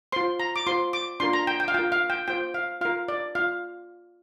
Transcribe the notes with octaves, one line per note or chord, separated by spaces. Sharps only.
F4 C5 C6
A#5
D6
F4 C5 C6
D6
D4 F4 A#4 C6
A#5
G5
G5
F5
F4 A#4 G5
F5
G5
F4 C5 G5
F5
F4 A#4 F5
D5
F4 F5